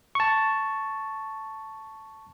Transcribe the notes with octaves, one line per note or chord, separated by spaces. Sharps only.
A5 C#6